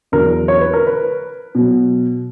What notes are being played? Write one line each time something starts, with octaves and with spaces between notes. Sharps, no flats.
E2 D3 F#3 A#4
C#5
B4
A#4
B4
B2 F#3